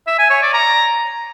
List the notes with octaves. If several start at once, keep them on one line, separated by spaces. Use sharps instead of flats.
E5
G#5
C#5
D5
A#5